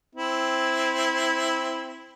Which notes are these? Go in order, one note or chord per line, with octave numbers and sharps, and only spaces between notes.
C4 E4